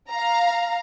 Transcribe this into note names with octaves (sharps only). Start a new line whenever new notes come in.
F5 A#5